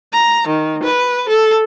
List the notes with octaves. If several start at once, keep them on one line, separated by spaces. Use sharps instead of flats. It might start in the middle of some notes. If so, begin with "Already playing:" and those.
A#5
D#3
B4
A4